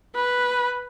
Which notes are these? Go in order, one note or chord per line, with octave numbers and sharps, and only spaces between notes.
B4